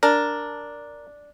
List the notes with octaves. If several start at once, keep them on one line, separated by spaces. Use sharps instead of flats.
D4 A#4